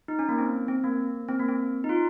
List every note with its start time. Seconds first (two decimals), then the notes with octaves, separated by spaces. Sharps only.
0.08 D#4
0.19 C#4
0.29 A#3
0.38 C4
0.68 C4
0.84 A#3
1.28 C4
1.39 A#3
1.49 C4
1.84 D#4
1.89 F4